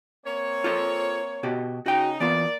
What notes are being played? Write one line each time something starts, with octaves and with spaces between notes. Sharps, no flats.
A#3 C4 C#5
F4 A4 C5
B2 F#4 G4
C#3 D#4 F#4 G5
E3 A#3 B3 F4 D5